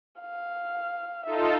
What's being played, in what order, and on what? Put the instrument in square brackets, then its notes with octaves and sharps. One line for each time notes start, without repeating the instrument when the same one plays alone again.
[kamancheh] F5
[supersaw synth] D#4 F4 A4 [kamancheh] E5